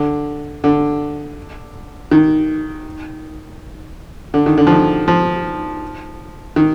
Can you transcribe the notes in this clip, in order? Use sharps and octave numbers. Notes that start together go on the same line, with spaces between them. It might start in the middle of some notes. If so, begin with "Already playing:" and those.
Already playing: D3
D3
D#3
D3
D#3
D3
F3
D#3
F3
D#3